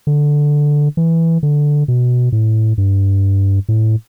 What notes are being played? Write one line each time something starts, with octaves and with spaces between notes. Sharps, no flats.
D3
E3
D3
B2
A2
G2
A2